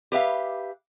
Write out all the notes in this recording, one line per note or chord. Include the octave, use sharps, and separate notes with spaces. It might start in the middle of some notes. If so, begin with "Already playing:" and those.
G4 B4 E5 F5